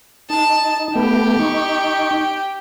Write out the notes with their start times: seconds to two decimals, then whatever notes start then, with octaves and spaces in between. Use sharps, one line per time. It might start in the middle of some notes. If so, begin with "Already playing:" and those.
0.30 D#4 A5
0.95 A3 B3 G4
1.39 D#4 C#6